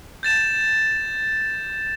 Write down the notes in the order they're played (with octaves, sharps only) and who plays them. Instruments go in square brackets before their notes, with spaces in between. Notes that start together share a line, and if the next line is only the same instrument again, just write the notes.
[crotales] G6 A6 E7